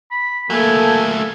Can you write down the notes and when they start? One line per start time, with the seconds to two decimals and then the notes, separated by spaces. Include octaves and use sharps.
0.11 B5
0.50 F#3 A3 A#3 A4 G#5